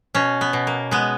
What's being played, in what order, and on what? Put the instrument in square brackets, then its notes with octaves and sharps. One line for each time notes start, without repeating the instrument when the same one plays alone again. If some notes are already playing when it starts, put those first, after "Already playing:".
[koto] B2 C#4
B3
B2
A#3
G#3 B3